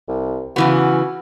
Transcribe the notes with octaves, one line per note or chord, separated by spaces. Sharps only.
C2
C#3 E3 B3 F#4